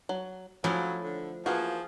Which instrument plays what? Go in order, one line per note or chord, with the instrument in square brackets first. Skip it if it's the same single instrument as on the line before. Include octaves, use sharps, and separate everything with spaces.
[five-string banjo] F#3
[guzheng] F3 A3 E4 [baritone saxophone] F#3 [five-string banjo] C#4
[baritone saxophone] D3
[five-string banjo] E3 A#3 F#4 [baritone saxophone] F3 [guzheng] G#4